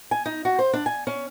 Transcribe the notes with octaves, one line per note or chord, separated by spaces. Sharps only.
G#5
D#4
F#4
C5
D4
G#5
C#4